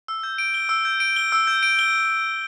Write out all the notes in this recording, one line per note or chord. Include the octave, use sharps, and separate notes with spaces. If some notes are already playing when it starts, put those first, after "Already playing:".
E6
G6
D7
G7
E6
G6
D7
G7
E6
G6
D7
G7